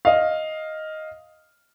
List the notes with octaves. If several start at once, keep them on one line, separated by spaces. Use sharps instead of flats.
D#5 F5